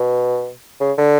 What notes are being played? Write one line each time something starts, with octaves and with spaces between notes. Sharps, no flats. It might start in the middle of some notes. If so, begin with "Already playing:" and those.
Already playing: B2
C#3
D3